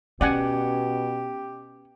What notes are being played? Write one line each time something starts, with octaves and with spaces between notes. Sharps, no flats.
B2 C#4 G4 D5 F#5 G#5